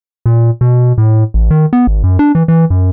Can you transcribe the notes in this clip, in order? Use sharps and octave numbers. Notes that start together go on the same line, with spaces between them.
A#2
B2
A2
A1
D#3
B3
G#1
F#2
D4
E3
E3
F#2